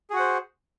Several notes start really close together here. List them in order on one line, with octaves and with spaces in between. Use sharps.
G#4 F#4 F#5 C5